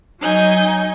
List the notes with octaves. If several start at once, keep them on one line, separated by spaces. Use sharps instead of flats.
F#3 D#4 G#5 G6